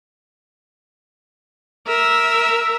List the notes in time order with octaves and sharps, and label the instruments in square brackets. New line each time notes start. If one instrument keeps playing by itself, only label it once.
[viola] A#4 E5